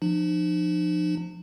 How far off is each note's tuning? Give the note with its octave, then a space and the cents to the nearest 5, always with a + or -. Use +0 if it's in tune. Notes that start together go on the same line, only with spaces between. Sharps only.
F3 +0 D#4 -45